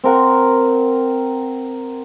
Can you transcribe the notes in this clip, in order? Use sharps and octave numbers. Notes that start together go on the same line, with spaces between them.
C4 A#4 F#5